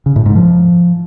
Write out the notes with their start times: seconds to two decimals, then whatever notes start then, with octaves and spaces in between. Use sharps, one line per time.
0.06 C#3
0.16 A2
0.26 G#2
0.36 F3